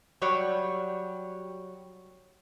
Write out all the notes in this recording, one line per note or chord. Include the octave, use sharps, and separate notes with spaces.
F#3 G3 F#4 G4 C#5 D5